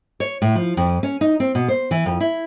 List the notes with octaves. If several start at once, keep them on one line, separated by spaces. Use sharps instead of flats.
C#5
A2
F3
F2
C#4
D#4
C4
B2
C5
E3
F2
E4